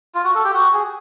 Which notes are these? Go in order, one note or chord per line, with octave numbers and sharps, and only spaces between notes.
F4
F#4
A4
G4
F#4
G#4